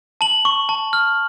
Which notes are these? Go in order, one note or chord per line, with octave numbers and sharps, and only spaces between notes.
A5 F#7
C#6
A5
F6